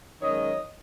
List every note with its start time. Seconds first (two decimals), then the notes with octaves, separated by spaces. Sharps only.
0.21 F#2 D#3 G#3 C#5 D#5